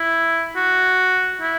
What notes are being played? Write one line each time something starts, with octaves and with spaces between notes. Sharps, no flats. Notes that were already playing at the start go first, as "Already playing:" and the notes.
Already playing: E4
F#4
E4